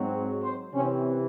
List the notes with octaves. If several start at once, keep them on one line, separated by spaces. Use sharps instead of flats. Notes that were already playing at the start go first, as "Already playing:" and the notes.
Already playing: G#2 F#3 C4
C5
C3 E3 C4 C#4